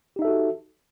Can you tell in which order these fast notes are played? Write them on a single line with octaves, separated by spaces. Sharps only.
G4 D#4 E5 A4 F#4